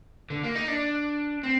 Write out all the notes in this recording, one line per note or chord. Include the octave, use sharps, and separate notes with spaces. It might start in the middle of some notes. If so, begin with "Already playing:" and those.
D3
A#3
D#4
D4
C4